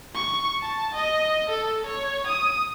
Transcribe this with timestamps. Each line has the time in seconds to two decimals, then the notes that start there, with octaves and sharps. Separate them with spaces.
0.15 C#6
0.62 A5
0.95 D#5
1.50 A4
1.86 C#5
2.27 D#6